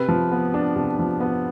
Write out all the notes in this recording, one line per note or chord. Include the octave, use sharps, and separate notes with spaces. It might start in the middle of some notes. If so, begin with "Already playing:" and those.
Already playing: C3 B4
F3
B3
D4
C3
F3
B3